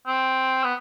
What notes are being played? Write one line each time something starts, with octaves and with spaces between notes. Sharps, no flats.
C4
B3